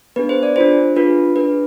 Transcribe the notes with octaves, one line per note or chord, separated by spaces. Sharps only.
B3 D4 G#4 B4
C5
D5
D4 F4 G#4 C5
D4 F4 G#4 B4
D4 G#4 B4